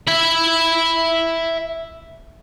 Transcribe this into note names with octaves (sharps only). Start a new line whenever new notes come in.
E5 B5